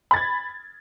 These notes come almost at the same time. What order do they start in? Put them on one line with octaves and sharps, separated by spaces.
B5 A6 G#6